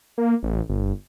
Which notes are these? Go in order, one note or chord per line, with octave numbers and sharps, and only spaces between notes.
A#3
A1
G1